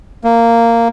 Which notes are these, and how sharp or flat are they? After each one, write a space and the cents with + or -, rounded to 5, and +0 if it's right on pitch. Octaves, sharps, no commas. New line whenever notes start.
A#3 -10